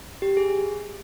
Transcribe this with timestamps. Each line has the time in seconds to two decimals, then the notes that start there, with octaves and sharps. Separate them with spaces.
0.22 G4
0.37 G#4